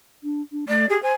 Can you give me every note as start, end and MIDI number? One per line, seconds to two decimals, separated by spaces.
0.24 0.42 62
0.52 0.65 62
0.68 0.88 57
0.68 0.86 74
0.89 0.98 67
0.89 1.02 68
1.02 1.13 72
1.02 1.14 80